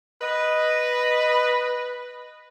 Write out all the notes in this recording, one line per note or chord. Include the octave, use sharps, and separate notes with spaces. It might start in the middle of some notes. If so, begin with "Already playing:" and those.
B4 D#5